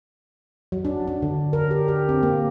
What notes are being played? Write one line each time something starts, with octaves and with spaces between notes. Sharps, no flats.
F#3
D4
D4
D3
A#4
G4
G4
C4
A#3